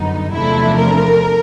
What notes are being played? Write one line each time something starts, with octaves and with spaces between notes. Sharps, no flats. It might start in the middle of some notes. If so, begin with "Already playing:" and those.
Already playing: F#2 D3 G3 B3 D#4
E2 C3 F3 A3 D4 E4
A#4